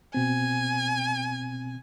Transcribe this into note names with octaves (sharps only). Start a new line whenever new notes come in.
B2 C4 G#5